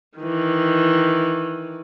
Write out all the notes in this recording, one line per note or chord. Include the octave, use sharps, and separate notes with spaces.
D#3 E3